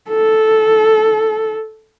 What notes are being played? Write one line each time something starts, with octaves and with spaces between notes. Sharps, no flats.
A4